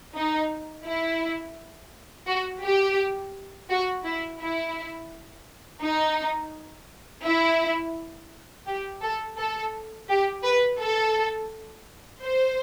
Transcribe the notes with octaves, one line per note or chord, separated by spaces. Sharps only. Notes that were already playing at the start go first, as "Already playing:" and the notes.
D#4
E4
F#4
G4
F#4
E4
E4
D#4
E4
G4
A4
A4
G4
B4
A4
C5